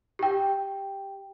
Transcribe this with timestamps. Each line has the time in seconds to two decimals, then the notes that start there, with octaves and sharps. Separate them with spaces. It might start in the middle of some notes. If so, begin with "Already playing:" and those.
0.19 G4 G5